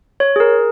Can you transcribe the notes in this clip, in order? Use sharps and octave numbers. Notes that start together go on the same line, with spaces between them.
C#5
G#4
A#4